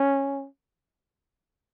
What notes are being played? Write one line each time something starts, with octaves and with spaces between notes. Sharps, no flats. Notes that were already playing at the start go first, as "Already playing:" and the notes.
Already playing: C#4